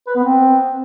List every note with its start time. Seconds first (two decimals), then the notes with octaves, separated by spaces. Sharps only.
0.07 B4
0.15 B3
0.23 C4